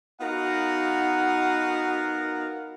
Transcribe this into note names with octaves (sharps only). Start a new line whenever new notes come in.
B3 D#4 F#4 A#4 F5 F#5